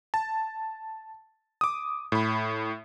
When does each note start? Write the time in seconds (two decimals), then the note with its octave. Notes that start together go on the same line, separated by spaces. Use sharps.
0.14 A5
1.61 D6 D#6
2.12 A2 B5